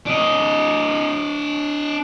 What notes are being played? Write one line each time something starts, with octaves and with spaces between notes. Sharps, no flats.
D4 D#5